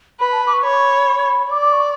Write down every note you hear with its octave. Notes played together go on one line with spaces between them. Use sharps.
B4 B5
A5
D6
C#6
C#5 B5
D5 D6
D6
C#6